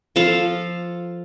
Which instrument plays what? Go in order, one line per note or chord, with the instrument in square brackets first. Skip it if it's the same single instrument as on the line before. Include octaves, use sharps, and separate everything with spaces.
[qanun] F3 A4 F5